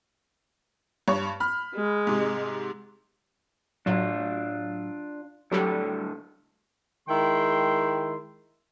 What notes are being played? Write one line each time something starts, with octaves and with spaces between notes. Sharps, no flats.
G2 C#5 C#6
B5 F6
G#3
G#2 C3
A2 F#3 D4 F4
A2 D3 F#3 G3 A4
D#3 G#3 E4 G5 C6